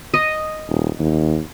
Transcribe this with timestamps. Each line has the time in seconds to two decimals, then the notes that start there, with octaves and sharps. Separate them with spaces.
0.14 D#5
0.69 D#1
0.99 D#2